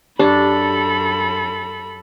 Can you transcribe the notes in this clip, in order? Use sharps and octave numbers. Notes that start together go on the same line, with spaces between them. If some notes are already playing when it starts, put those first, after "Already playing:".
F#2 D4 G4 A4 B5